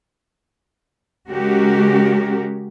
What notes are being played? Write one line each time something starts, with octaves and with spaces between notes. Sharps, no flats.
C#3 G#3 C#4 F#4 G4 A#4